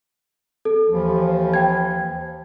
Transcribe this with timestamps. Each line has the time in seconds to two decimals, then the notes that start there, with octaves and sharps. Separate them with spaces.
0.65 A4
0.89 D#2 E3 F3
1.54 G5 G#6